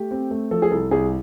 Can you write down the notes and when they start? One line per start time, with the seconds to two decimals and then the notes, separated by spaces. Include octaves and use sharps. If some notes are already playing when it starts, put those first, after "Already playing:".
Already playing: A3 G4
0.11 C4
0.31 A3
0.51 F3 A4
0.62 G#4
0.71 C2 A4
0.91 C2 G#4